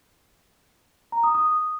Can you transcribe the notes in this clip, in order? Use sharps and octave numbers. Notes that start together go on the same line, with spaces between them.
A#5
D#6
D#6